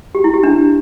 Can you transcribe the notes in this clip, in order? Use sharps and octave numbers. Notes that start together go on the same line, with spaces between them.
G4
E4
G4
D4